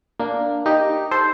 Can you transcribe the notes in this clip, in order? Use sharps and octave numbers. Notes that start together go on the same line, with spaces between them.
A#3 D4
D#4 G4
A4 C5